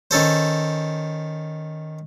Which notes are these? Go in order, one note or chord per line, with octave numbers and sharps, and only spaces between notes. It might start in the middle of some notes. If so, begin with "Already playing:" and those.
D#3 C#4 A4 C5